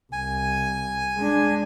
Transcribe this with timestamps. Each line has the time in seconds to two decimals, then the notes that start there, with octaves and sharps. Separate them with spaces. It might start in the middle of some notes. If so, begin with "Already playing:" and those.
0.13 C2 G#5
1.18 G#3 D4